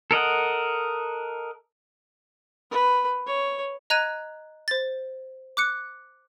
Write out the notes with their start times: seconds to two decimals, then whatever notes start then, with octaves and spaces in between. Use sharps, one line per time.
0.11 A4 A#4 D#5 F#5
2.71 B4
3.27 C#5
3.90 D#5 A#5 F#6 G#6 D#7
4.68 C5 A6
5.57 D6 F#6 C#7